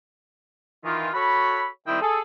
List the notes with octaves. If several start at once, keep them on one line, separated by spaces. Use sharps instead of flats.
D#3 E3 F4
F#4 A4 C#5 B5
D#3 G3 C4 E4 G5 D#6
G#4 A4